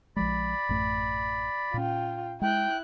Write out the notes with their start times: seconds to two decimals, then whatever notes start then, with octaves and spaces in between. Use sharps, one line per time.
0.16 A#1 F3 G#3 D5 B5
0.69 A1 F#2 A3
1.74 A#2 C#4 F4 G5
2.41 G#3 E4 G5 F#6